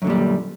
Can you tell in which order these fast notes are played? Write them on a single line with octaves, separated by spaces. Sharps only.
F#2 D3 A#2 G3